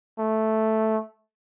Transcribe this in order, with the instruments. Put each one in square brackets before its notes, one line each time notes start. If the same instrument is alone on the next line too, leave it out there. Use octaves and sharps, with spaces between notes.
[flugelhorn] A3